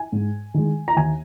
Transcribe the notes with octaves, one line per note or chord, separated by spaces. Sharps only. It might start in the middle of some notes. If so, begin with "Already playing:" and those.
Already playing: G#5
G#2
D#3 G#3
A#5
D#2 G#5